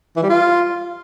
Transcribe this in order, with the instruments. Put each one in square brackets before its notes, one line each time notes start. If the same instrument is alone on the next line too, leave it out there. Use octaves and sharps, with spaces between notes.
[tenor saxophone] E3
G3
F4